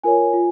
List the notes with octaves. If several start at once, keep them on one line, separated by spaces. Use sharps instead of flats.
F4 A#4 C#5 G#5
F4